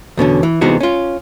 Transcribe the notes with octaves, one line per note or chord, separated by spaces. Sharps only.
E2 B2 D3 C#4
E3
C3 E3 G#3 B3 D#4 F#4
C#4 F4